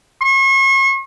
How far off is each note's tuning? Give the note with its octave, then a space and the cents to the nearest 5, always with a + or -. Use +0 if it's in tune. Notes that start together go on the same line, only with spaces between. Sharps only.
C#6 -40